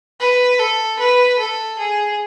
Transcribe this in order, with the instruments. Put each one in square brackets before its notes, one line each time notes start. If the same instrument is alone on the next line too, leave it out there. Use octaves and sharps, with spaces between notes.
[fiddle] B4
A4
B4
A4
G#4